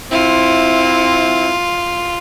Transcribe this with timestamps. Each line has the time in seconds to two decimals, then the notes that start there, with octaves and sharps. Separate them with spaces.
0.11 C4 E4 F4